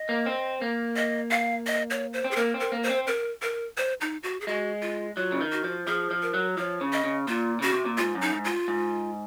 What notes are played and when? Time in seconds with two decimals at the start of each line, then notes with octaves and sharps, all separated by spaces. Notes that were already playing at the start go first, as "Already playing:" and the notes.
Already playing: D#5
0.09 A#3
0.26 C4
0.62 A#3
0.96 D#5
1.31 F5
1.67 D#5
1.90 C#5
2.13 C5
2.24 C4
2.31 G#4
2.36 A#3 A#4
2.54 C4
2.60 A#4
2.72 A#3
2.83 C5
2.89 C4
3.07 A#4
3.42 A#4
3.77 C5
4.01 D#4
4.23 F#4
4.41 G#4
4.47 G#3 F#4
4.82 F4
5.17 F#3 F4
5.32 C#3
5.41 D#3
5.52 F#4
5.64 F3
5.87 F3 G#4
6.11 F3
6.22 A#4
6.34 F#3
6.57 F3 C#5
6.81 C#3
6.93 D#5
7.04 C#3
7.28 A#2 F4
7.60 C#3 F#4
7.73 C3
7.86 A#2
7.97 G#2 F4
8.15 F#2
8.22 D#4
8.33 G#2
8.45 F4
8.68 G#2